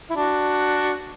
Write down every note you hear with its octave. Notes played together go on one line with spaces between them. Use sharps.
E4
D4 F#4